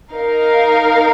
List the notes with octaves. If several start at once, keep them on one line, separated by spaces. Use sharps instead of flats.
D#4 A#4 F5